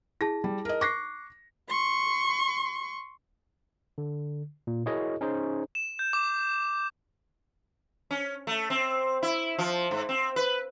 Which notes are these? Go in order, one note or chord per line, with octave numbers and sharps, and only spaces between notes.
E4 G#4 A5 A#6
G3
A#4 D#5
C#6 D6 F#6 A#6 C7
C6 C#6
D3
A#2
E4 F#4 G#4 A#4 C#5 D#5
C#4 D#4 G#4 C5
E7
G6
D6
C#4
A3
C4
E4
F3
G#2
C4
B4